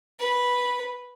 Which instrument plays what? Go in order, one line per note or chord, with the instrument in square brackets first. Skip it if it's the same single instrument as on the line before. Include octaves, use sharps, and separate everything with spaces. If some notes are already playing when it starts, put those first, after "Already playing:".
[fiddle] B4